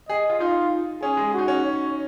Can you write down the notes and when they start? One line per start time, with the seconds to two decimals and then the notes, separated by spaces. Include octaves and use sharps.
0.08 G#4 D#5
0.30 F4
0.40 D#4 F4
1.02 C#4 G#4
1.17 G#3
1.33 D#4 F#4
1.48 C#4
1.64 C#5